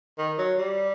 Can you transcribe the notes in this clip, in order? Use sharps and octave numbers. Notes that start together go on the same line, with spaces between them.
D#3
F#3
G3